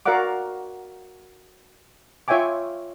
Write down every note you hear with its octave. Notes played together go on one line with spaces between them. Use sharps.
F#4 A#4 D5 F5 F#5 D6
F4 C#5 E5 G5 G#5 D6